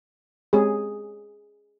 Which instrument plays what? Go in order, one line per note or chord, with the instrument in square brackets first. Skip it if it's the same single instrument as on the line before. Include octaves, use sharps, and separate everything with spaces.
[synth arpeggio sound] G#3 C4 G4 C#5 [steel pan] G#4